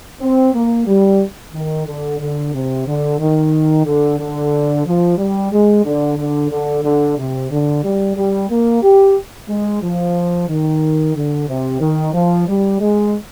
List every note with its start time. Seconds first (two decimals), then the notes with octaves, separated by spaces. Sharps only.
0.21 C4
0.54 A#3
0.87 G3
1.54 D#3
1.87 D3
2.20 D3
2.53 C3
2.87 D3
3.19 D#3
3.86 D3
4.19 D3
4.86 F3
5.18 G3
5.52 G#3
5.85 D3
6.17 D3
6.51 D3
6.84 D3
7.18 C3
7.51 D3
7.84 G3
8.16 G3
8.50 A#3
8.82 G4
9.49 G#3
9.83 F3
10.49 D#3
11.15 D3
11.49 C3
11.81 D#3
12.14 F3
12.48 G3
12.80 G#3